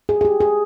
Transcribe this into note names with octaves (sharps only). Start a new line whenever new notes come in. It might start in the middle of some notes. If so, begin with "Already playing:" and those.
G#4
G#4
G4
G#4